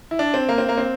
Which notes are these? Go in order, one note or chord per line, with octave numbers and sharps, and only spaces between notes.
E4
D4
C4
A#3
C4
A#3
C4